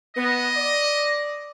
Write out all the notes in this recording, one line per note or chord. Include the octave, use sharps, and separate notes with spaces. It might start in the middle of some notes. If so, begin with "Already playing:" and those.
B3 D#5
D5